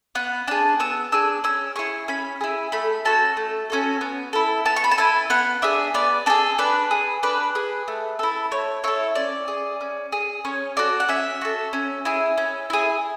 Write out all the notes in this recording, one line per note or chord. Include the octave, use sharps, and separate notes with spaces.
B3 F#5
D4 G#4 A5
B3 E6
D4 G#4 E6
C#4 E6
E4 G#4 C#6
C#4 B5
E4 G#4
A3 B5
C#4 F#4 A4 A5
A3
C#4 F#4 A4
B3
E4 A4
B3 A5
C#6
B5
A5
E4 A4 G#5
B3 F#5
D4 G#4 E5
B3 D5
D4 G#4 A4
D4 B4
G#4
D4 B4
G#4
A3
E4 A4
A3 C#5
E4 A4 C#5
C#4 D5
G#4
C#4
G#4
C#4 C#5
F#4 A4 D5
F#5
C#4 E5
F#4 A4
C#4
E4 G#4
C#4
E4 G#4